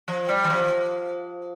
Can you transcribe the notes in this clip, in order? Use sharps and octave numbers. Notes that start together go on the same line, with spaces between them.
F3
G3
E3
F3